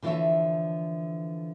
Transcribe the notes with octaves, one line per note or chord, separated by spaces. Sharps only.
D3 E3 F3 E4 C#5 E5